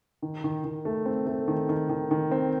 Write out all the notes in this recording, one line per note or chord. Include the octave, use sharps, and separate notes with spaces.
D#3
D#3
D#3
A3
C4
A3
D#3
D#3
D#3
D#3
C4